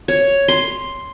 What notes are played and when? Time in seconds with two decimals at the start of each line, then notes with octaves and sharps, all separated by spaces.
0.08 C#5
0.48 C6